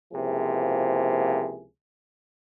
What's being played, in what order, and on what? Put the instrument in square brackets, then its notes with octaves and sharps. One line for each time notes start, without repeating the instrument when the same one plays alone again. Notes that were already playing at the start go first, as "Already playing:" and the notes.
[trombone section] C#2 C3 F3 A#3 E4 G#4